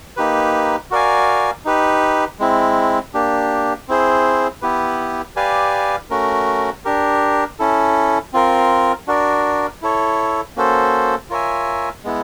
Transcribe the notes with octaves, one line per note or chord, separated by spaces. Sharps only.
A#3 D#4 G4 B4
F#4 A#4 D5 F5 G#5
D#4 G4 B4
G#3 C4 E4
A#3 D4 G4
C4 E4 G#4 C5
B3 E4 G4 B4
G4 B4 D5 F5 G#5
A3 C#4 F#4 A#4
D4 G4 A#4
C#4 E4 A4
C4 F4 A#4
D4 F#4 A#4 D5
E4 A4 C#5
A#3 C#4 F#4 A4 C5
F4 A#4 C#5 E5 G#5
G#3 B3 E4